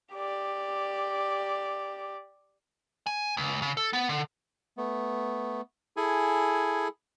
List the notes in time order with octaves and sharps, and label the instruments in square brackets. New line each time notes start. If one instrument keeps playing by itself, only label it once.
[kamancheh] G4 D5
[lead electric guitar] G#5
C#2
C#3
A4
B3
D3
[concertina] A3 B3
E4 G#4 A4 G#5